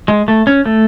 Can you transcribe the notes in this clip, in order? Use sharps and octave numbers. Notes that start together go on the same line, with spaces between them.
G#3
A3
C#4
A3